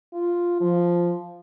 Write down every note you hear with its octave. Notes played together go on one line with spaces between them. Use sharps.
F4
F3